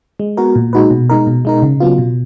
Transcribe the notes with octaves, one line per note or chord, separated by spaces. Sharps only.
G#3
B3 F#4 A#4
A#2
G#3 D#4 F#4 B4
B2
G#3 D#4 A#4
B2
G#3 D#4 A#4
C#3
F#3 B3 F4
B2